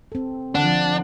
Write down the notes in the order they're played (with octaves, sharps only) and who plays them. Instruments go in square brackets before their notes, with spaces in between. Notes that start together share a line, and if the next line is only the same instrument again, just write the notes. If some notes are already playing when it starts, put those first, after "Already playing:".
[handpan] C4 A4
[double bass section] D3 F3 [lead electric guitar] D4 [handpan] F#5